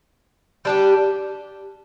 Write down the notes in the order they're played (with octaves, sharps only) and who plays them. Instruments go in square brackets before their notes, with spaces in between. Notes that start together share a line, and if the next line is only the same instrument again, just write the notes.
[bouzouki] G3 D4 G4